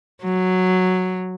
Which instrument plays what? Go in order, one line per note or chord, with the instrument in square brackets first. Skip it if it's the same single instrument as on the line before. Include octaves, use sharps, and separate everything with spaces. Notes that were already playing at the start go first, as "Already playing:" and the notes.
[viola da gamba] F#3